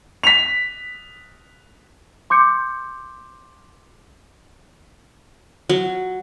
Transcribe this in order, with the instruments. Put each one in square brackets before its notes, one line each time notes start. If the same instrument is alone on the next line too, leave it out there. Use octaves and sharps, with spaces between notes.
[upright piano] B6 F7
[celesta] C6 D6 G6 C#7
[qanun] F#3